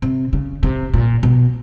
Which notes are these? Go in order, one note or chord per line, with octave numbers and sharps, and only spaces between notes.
C3
C#3
C3
A#2
B2